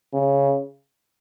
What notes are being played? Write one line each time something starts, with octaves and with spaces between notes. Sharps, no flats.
C#3